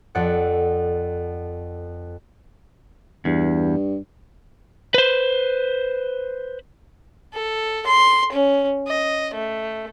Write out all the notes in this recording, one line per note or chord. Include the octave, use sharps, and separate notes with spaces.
F2 A4 D5 F#5
E2 G2
B4 C5
A4
C6
C#4
D#5
A3